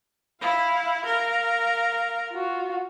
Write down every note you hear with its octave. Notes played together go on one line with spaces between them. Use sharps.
E4 F5
A#4 F5
F4 F#4